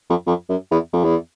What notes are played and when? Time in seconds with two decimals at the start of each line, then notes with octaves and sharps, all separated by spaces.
0.10 F2
0.27 F2
0.49 F#2
0.71 E2
0.93 F2
1.04 E2